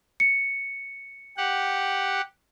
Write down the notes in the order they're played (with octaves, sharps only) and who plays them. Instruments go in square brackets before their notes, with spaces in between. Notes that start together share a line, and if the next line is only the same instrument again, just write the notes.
[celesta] C#7
[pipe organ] G4 F#5